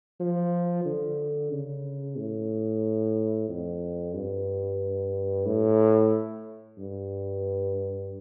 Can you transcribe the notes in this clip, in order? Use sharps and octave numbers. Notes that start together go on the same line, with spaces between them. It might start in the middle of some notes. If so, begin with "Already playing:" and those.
F3
D3
C#3
A2
F2
G2
A2
G2